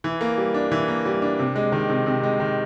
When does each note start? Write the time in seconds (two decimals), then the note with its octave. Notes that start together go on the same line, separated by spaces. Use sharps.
0.04 E3
0.21 A#3
0.38 G3
0.54 D4
0.72 E3
0.88 A#3
1.05 G3
1.22 D4
1.39 C3
1.56 G#3
1.72 D#3
1.90 C3
2.06 C3
2.23 G#3
2.40 D#3